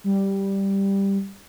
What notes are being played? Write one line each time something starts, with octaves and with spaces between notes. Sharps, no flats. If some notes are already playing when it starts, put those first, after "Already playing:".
G3